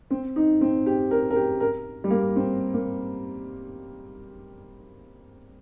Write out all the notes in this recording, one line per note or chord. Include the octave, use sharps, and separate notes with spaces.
C4
D#4
C4
G4
A#4
A#4
G4
A#4
G3
A#3
C4
A#3